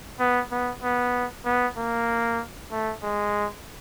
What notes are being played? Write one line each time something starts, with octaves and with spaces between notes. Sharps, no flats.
B3
B3
B3
B3
A#3
A3
G#3